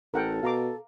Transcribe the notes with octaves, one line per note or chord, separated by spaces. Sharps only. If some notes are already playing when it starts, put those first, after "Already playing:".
A1 A4 A#4 F#5 G5
B2 F5 A#5 D6